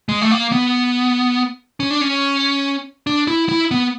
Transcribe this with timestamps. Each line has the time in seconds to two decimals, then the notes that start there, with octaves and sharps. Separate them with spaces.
0.09 G#3
0.22 A3
0.31 A#3
0.52 B3
1.80 C#4
1.90 D4
2.01 C#4
3.07 D4
3.27 E4
3.49 E4
3.71 B3